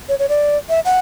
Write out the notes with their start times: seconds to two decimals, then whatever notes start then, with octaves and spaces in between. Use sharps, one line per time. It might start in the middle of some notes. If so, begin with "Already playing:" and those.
0.09 C#5
0.19 C#5
0.29 D5
0.69 E5
0.85 F#5